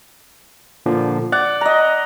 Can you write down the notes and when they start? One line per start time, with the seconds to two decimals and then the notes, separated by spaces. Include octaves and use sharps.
0.86 A#2 D3 F3
1.32 D5 F#5
1.61 D#5 A#5